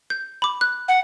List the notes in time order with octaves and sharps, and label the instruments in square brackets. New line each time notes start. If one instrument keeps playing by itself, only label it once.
[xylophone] G6
B5 D6
F#6
[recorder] F#5